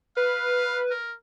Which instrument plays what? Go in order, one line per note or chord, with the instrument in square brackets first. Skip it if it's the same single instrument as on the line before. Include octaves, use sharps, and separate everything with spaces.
[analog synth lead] B4 [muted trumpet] F5
[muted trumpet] A#4